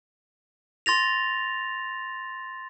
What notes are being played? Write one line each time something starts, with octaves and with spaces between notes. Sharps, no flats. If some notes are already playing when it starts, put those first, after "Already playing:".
C6 A6 A#6 F7